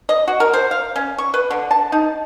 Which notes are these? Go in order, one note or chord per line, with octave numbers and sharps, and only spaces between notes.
D#5
F#4
A#4
C5
F5
C#4
C#6
B4
D3
A5
D#4